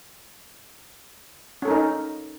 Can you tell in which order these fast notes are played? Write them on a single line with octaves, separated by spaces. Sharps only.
C#4 A4 A#4 D#4